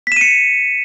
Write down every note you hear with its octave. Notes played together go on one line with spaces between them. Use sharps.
B6 C#7 D#7 E7